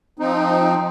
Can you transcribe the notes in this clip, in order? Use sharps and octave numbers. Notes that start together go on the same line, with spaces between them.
F3 C4 D#4